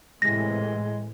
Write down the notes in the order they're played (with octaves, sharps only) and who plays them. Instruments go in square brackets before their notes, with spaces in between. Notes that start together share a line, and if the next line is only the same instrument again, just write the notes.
[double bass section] A2 C3 E3 [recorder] G#3 [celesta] A#6